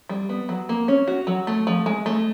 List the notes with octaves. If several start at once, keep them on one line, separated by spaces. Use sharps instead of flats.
G3
B3
F#3
A#3
C#4
F#4
F#3
A3
F3
G#3
A3